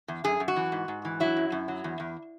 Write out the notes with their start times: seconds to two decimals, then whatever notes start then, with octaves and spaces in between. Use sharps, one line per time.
0.08 E2
0.24 F#2 G#4
0.40 F#2
0.48 F#4
0.56 E3
0.72 G#2
0.88 G#2
1.05 E3
1.20 F#3 E4
1.37 F#2
1.52 F#2
1.68 F#3
1.84 E2
2.00 E2